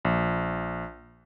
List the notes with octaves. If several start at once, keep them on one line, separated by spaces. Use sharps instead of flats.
A#1